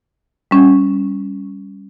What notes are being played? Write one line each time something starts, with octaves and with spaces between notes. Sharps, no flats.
G3 C#4